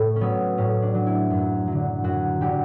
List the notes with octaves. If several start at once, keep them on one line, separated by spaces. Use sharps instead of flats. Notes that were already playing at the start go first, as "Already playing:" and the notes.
Already playing: A2 A3
C#4
F#3 B3
A2 C#4
D4
F#3
E4
F#2
D3 F#3
F#2 F#4
D3 F#3 G4